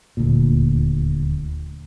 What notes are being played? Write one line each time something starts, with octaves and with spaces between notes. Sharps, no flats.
D#1 D2 A#2